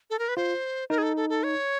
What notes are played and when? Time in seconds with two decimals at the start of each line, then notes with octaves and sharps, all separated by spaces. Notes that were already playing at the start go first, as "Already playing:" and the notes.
0.10 A4
0.19 A#4
0.28 B4
0.37 F4 C5
0.90 D#4 A#4
0.98 G#4
1.03 A4
1.16 A4
1.30 A4
1.44 C#5